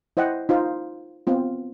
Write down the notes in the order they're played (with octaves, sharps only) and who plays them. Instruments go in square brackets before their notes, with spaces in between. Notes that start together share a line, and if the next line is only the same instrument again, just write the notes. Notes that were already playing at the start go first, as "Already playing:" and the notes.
[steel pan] E4 C5 D#5 F#5 G5
D#4 F4 C5
B3 C4 F4